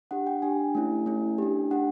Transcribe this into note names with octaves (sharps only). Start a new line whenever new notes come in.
D4 G4 F#5
G5
D4 G4 G#5
A3 C#4 E4
A3 C#4 E4
D4 G4
D4 G4 F#5